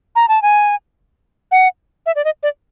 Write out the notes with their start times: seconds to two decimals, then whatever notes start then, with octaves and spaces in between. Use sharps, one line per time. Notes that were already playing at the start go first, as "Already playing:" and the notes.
0.16 A#5
0.28 A5
0.42 G#5
1.51 F#5
2.06 E5
2.16 D5
2.25 D#5
2.43 D5